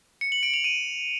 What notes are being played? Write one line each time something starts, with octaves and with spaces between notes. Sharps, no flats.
C#7
F#7
D7
F7
D#7